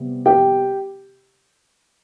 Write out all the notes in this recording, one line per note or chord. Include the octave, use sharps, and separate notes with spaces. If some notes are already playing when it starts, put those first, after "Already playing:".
Already playing: C3 G3 B3
G4 G5